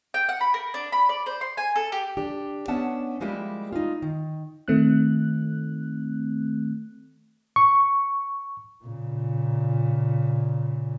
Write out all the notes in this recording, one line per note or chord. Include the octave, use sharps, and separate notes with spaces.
G5
F#5
B5
A#4
D4
B5
D5
C5
C6
G#5
A4
G4
D4 G4
B3 C#4 D4 E5 F#5 A5
F3 G3 G#3 A#3 E4 G4
D#4 F4
D#3
D#3 A3 C4 F#6
C#6
A#2 C#3